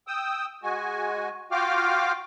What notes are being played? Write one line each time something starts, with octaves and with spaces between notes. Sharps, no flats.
G5 D#6 E6
G#3 F#4 G#5
F4 F#4 F5 G5 D6 F6